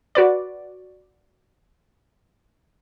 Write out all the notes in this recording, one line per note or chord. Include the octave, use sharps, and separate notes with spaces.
F#4 B4 D5